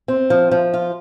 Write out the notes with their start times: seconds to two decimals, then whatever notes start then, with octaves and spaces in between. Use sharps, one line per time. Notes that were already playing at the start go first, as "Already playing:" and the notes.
0.08 C4
0.30 F3
0.51 F3
0.74 F4